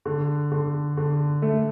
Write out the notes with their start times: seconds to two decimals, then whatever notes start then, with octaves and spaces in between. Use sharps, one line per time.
0.05 D3
0.51 D3
0.97 D3
1.42 A3